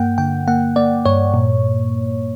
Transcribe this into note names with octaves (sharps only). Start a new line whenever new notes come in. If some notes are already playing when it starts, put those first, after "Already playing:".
Already playing: G2 A#3 F#5 G5
D3 G5
A#3 F#5
A#3 D5
G2 C#5
A#2